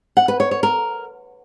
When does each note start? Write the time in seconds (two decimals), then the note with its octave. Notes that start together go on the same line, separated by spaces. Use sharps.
0.17 F#5
0.28 B4
0.40 C#5
0.51 C#5
0.63 A#4